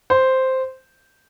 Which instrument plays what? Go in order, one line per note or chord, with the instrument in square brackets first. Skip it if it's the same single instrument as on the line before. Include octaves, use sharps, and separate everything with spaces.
[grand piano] C5